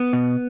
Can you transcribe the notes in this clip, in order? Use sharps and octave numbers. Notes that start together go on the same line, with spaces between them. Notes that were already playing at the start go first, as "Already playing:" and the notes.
Already playing: B3
B2